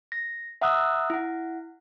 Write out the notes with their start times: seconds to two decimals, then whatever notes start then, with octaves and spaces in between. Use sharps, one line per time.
0.12 A#6
0.61 E5 F#5 A#5 D#6 E6 F#6
1.10 E4 F#5